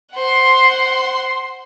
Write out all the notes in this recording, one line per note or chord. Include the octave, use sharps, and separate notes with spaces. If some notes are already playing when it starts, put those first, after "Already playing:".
C5 F#5 C6